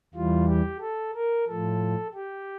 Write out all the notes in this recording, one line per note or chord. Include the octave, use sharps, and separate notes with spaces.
E2 E3 G3 F4
G4
A4
A#4
A2 F3 A4
G4